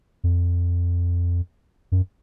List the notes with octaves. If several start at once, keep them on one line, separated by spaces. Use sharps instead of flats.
F2
F#2